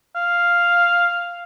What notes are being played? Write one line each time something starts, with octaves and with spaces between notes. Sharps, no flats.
F5